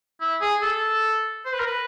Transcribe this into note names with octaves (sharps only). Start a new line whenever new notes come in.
E4
G#4
A4
C5
B4
A#4
B4